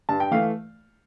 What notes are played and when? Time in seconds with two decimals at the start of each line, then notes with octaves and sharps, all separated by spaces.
0.09 G2 A5
0.20 G5
0.31 E3 A3 F5